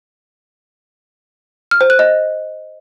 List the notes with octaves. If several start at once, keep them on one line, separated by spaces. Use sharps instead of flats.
F6
C5
F#6
D#5